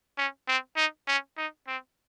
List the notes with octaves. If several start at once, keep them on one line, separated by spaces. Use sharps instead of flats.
C#4
C4
D#4
C#4
D#4
C4